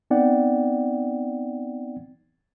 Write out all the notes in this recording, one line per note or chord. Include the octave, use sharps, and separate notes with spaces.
B3 C4 D#4 D5 F#5 G5